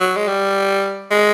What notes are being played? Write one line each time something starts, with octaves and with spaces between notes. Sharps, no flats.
F#3
G#3
G3
G#3